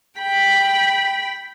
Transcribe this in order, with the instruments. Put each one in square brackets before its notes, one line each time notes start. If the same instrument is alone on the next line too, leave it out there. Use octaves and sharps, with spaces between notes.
[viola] G5 B5